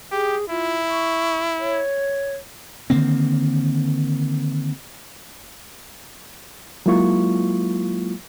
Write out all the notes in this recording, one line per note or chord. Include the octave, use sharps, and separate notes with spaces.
G4 G#4
E4 F4
C#6
C#5
D3 D#3 A#3 C4
F#3 G#3 A#3 E4 F4 C#6